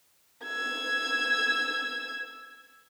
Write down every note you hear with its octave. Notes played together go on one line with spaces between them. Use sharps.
E6 G#6